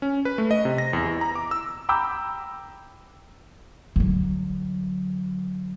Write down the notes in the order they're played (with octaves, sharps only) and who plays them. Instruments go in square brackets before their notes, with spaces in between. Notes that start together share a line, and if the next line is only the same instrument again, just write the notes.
[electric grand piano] C#4
B4
A3
D#5
C3
A#6
E2
E3
A#5
D6
E6
[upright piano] G5 A#5 B5 D6 E6 G6
[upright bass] D3 F#3